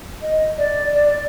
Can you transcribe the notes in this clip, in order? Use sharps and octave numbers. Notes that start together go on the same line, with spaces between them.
D#5
D5
D5